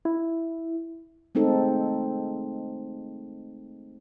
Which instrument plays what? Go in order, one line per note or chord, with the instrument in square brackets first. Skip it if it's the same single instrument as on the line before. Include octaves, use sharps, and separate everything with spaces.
[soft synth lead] E4
[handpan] G#3 A3 C4 D#4 A4